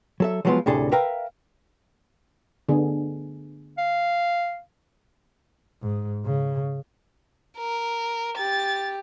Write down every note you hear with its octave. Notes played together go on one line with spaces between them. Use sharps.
F#3 A4 E5
F3 F#3 G#3 B3 D#4 F4
D2 A2 C3 D4 G#4 A4
A#4 B4 E5 F5 G5 A#5
D3 B3 G#4
F5
G#2
C#3
A#4
G4 A6